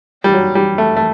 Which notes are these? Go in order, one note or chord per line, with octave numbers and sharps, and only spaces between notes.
G3
F#3
G3
A3
A3